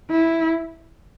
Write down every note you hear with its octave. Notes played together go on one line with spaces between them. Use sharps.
E4